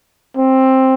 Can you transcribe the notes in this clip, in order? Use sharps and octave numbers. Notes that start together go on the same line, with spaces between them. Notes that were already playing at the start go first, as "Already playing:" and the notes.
C4